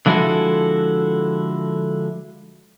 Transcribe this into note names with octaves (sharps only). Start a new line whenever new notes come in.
D3 F3 G#3 E4 F#4 A4